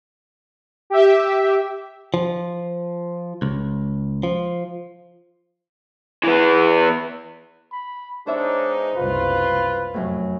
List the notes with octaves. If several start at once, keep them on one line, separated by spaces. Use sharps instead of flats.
G4 E5
F3
C#2
F3
E3 B3
B5
B2 G#3 D4 D#4 C5 C#5 E5
F#1 C2 F4 B4
F1 F#2 A2